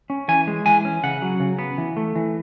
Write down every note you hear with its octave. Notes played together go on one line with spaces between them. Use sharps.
C#4
E3 G#5
G#3
E3 G#5
C#4
C#3 F#5
F#3
C#3
B3
E3
A3
E3